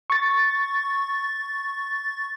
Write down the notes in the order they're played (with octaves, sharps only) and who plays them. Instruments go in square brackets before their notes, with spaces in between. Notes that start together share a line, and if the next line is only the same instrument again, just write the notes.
[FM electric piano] C#6 A6